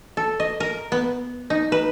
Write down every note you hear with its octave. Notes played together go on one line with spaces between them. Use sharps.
A4
D#5
A#4
B3
D#4
B4